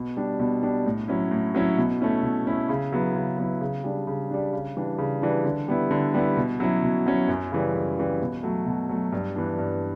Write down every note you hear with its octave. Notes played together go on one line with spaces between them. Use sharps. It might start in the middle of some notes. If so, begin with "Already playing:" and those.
Already playing: B2
G3 D4
B2
G3 D4
A2
F#3 C#4 E4
A2
F#3 C#4 E4
B2
A3 C#4 E4
B2
A3 C#4 E4
C#3
F#3 B3 E4
C#3
F#3 B3 E4
C#3
G3 D4
C#3
G3 D4
C#3
E3 G3 D4
C#3
E3 G3 D4
D3
G3 B3 E4
D3
G3 B3 E4
B2
F#3 C#4 E4
B2
F#3 C#4 E4
F#2
C#3 E3 G3
F#2
C#3 E3 G3
B2
F#3 A3
B2
F#3 A3
G2
E3 B3 D4
G2